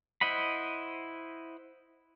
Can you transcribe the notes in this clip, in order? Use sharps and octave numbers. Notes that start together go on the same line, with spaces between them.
E4 C5 D#5 F#5 B5